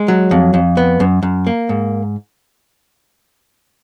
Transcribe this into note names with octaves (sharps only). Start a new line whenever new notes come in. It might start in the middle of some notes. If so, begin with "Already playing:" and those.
Already playing: G#3
F#3
F2
F2
B3
F#2
F#2
A#3
G#2